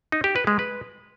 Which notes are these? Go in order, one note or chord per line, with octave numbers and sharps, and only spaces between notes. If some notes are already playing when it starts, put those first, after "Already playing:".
D#4
G4
B4
G#3
B4